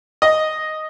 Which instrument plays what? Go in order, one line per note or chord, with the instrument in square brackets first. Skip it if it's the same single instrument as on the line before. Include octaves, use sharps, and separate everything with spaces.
[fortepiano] D#5